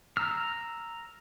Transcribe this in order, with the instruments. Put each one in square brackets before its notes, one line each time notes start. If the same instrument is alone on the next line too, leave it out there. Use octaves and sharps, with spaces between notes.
[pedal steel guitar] A#5 E6 F6